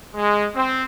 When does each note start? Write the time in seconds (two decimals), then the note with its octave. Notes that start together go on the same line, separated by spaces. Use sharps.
0.14 G#3
0.54 C4